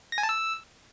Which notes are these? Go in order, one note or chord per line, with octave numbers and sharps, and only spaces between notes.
A#6
G#5
A5
E6